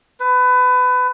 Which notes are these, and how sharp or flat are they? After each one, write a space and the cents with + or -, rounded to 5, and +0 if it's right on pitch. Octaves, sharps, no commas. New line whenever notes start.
B4 +25